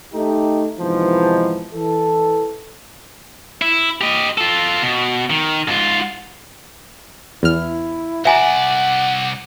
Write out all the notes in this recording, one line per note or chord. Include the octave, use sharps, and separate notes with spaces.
A3 D#4 G4
G#2 C3 E3 F3 B3 D#4
E3 A4
E4
G4 D#5
F4 A4
B2
D#3
G#2 F4
E2 E4 F6
C2 D5 E5 F#5 G#5 A#5